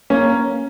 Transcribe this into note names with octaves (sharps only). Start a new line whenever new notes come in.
A#3 C#4